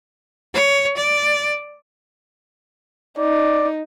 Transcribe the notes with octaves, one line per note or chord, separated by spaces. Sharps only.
C#5
D5
D#4 D5